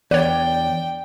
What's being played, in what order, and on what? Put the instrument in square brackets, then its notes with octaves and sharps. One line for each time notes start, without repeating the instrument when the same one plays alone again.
[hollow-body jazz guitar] E2 [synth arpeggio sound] B4 C#5 [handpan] D5 [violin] G5